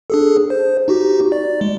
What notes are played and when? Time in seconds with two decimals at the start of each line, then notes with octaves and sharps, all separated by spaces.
0.10 D4 G#4 A4
0.50 C5
0.88 D#4 F#4 G4
1.32 D5
1.61 G#3